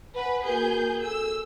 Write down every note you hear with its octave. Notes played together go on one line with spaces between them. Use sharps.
B4 F#5 G#5
A#3 F#4 G#4 A#4 G6
A4 E6